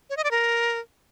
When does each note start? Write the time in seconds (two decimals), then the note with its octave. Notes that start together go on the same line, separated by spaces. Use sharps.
0.10 C#5
0.17 D#5
0.24 D5
0.31 A#4